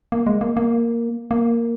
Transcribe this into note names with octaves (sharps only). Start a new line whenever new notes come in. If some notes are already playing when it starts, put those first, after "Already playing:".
A#3
G#3
A#3
A#3
A#3